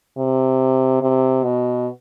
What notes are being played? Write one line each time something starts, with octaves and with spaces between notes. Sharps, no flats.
C3
C3
B2